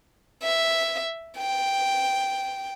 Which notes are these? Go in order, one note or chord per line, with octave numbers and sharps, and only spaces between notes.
E5
G5